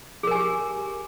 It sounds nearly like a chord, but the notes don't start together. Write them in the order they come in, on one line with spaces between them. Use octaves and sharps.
G#4 A#4 G#5 G4